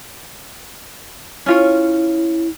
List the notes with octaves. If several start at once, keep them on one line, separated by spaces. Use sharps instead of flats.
C#4 E4 F4 C#5